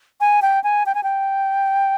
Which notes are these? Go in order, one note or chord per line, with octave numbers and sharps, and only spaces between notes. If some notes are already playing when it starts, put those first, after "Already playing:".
G#5
G5
G#5
G5
G#5
G5